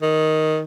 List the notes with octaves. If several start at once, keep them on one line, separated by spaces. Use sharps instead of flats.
D#3